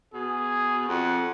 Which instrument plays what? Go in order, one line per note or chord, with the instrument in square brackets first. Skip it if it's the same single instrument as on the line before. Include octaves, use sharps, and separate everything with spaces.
[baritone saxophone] B2 [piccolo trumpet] G#4
[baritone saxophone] F2 [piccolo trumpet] F#5